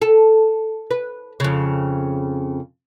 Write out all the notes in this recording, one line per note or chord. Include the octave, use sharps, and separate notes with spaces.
A4
B4
F2 C#3